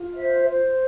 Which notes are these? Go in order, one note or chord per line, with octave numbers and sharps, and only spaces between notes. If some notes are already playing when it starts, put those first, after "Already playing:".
Already playing: F4
C5 E5
C5